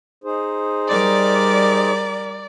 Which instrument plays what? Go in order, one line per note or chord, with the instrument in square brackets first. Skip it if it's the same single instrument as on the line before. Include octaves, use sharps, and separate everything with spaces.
[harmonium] D#4 G#4 C5
[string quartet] G3 A#4 D6 [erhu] D5